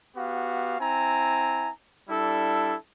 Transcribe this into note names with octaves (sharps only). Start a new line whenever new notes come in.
B3 F#4 G4 F5
C4 E4 G#5 A#5
G3 D4 E4 A4